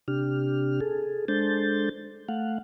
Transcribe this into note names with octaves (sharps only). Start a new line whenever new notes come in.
C3 D4 G4 F6
G#4 A4
G#3 D4 A4 C5 G6 A6
A3 F5 F#5